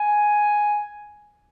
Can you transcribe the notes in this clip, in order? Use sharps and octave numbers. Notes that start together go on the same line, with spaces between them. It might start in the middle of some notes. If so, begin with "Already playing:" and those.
Already playing: G#5